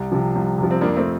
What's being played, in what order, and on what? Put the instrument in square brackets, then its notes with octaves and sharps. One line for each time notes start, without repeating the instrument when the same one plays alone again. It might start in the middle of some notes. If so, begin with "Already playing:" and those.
Already playing: [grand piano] C2
C3 F3
C2
C3 F3
[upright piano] C4
[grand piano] F2 [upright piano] A#3 D4
[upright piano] A3 C4